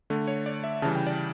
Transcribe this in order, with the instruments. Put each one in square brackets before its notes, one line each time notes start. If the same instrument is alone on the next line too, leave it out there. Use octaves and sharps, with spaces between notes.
[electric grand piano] D3 A3
C#5
D5
E5
C#3 A5
E3 G3
G5
D5